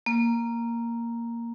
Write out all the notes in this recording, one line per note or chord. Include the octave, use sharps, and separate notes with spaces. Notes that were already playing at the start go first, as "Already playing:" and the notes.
A#3